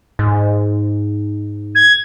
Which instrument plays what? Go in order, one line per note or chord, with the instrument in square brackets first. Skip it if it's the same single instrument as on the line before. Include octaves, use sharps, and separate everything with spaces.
[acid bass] G#2
[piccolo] G#6